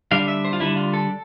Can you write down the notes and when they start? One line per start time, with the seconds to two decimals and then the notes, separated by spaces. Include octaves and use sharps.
0.11 D3 G3 D4 F5
0.28 E5
0.45 C5
0.53 F4
0.60 D3 G3 D4 E4
0.77 F4
0.94 A4